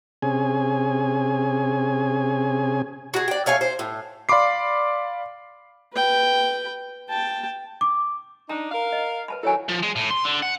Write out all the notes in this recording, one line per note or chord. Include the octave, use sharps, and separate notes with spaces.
C3 C#4 G#4 G#5
F#4 G#4
D5 G5
A3 C#5 F5 G#5
C5
A2
D5 F5 B5 C6 D6 C7
B4 G5
G5 A5
D6
D4 D#4 A5 A#5
A#4 F5
D#5
B4 A5 B5
D#3 F#3 E4 A4 C#5 G#5
F3
G#3
A2
C6
D3
F#5